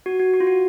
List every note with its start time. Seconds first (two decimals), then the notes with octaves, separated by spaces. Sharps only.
0.06 F#4
0.20 F#4
0.34 F#4
0.40 F4
0.47 F#4